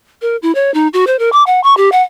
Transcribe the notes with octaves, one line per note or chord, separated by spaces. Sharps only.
A#4
E4
C#5
D#4
F#4
C5
A#4
D6
F#5
C#6
G4
F#5